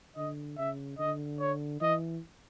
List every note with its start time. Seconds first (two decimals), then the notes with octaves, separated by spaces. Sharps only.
0.16 D3 D#5
0.58 C#3 E5
0.99 D3 D#5
1.40 C#5
1.81 E3 D#5